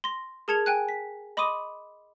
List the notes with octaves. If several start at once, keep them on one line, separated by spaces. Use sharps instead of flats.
C6 A#6
G#4 A#4 A5 G#6 C#7 F7
G5 G#5 F#6
B6
D#5 B5 C6 D6 D#6 D#7